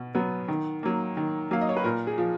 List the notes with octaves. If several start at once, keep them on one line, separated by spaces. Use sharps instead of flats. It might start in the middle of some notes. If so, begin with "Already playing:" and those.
Already playing: B2
F#3 B3
D#3
F#3 A#3
D#3
F#3 A#3 F5
D#5
C#5
B4
A#2 A#4
G#4
F3